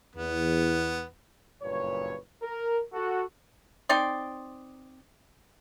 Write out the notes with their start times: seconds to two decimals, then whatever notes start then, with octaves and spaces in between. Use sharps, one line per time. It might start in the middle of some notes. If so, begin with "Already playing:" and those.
0.15 E2 B3
1.62 F#1 G2 A#2 B4 C#5
2.41 A#4
2.92 F#4 A4
3.89 C4 D#4 D5 C6